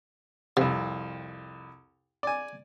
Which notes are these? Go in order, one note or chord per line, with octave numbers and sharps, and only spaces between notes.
C2 F2 C3
D5 G#5